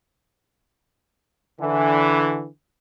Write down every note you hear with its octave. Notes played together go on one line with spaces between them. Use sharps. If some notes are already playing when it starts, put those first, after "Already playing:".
D3 E3